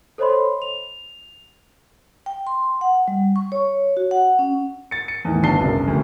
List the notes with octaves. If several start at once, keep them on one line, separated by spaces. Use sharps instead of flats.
A4 C5 C#5 D#5 B5 C6
F7
G5
C6
F#5
G3
C#6
C#5
F#4
F#5
C#4
A6 C#7
C#7
E2 A2 D#3
G1 D4 A5 C7 G7
F#1 C2 F#2
D1 D2